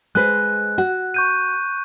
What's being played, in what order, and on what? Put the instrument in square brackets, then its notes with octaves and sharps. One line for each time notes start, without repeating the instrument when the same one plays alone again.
[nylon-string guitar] G#3 B4 C5 [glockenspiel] F#6
[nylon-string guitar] F#4
[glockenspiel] C#6 G6 D#7